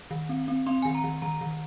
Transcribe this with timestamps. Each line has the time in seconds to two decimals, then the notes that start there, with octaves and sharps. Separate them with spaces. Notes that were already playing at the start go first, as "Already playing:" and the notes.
0.11 D#3
0.29 C4
0.48 C4
0.66 C4 C6
0.82 D#3 G#5
0.95 A#5
1.04 D#3
1.22 D#3 A#5
1.41 D#3